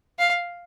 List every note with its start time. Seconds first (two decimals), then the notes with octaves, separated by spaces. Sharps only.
0.19 F5